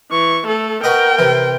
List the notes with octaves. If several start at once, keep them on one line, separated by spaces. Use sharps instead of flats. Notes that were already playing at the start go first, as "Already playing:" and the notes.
E3 C#6
A3 A4
F#4 A#4 B4 D#5 G5
C3 E3